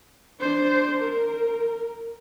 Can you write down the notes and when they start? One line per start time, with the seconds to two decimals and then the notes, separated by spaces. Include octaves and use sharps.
0.40 D4 C5
1.01 A#4